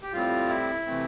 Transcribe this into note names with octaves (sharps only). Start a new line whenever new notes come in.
G4
A2 G3 C4 F4
E4
C3 E3 A3 C4